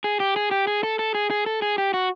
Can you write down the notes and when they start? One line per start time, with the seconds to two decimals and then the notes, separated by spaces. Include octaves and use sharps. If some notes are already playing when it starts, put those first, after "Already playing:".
0.04 G#4
0.20 G4
0.36 G#4
0.51 G4
0.67 G#4
0.83 A4
0.99 A4
1.15 G#4
1.30 G#4
1.46 A4
1.62 G#4
1.78 G4
1.94 F#4